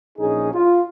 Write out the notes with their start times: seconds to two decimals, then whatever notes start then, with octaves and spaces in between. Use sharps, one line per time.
0.18 A#1 C#4 D#4 G#4
0.54 F4